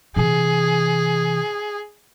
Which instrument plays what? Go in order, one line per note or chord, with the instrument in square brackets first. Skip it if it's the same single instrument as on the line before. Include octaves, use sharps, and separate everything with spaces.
[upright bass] C3 E3 [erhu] G#4